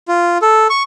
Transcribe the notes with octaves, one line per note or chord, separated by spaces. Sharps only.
F4
A4
C#6